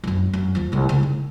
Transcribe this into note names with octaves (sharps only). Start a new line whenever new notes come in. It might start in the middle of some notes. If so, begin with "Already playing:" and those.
A#1 F#2
F#2
D#2 F3
C2 A#2
C#2 C#3
D#4